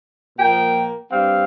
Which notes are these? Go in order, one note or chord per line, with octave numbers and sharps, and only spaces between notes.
A#2 F3 A#3 G5
G2 G3 C4 F5